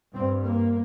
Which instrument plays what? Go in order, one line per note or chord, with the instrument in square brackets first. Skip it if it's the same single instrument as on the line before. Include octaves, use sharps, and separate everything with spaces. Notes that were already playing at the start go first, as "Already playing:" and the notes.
[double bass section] G2 C4
A#3